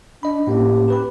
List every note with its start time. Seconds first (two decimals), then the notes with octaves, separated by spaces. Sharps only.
0.23 D4 D#5 B5
0.47 A2 A#3 C#4 G4
0.88 G4 B4 B5